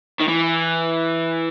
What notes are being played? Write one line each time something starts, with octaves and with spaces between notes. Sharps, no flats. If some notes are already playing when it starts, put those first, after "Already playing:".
D#3
E3